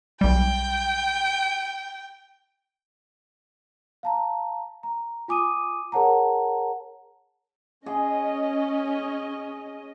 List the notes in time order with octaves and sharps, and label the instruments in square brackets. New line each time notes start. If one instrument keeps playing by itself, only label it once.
[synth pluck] B1 G3 [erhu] G5
[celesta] F5 A5 A#5
A#5
F4 G#5 D6 D#6 D#7
G#4 A#4 C#5 F#5 A5 A#5
[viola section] C#4 D#5 [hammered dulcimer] G#4